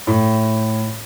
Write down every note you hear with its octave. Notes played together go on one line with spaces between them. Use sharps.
A2